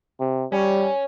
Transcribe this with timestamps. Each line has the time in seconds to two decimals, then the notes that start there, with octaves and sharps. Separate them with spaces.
0.20 C3
0.52 G3 C#4